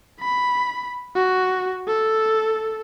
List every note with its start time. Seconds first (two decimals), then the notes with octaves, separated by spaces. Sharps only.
0.20 B5
1.16 F#4
1.87 A4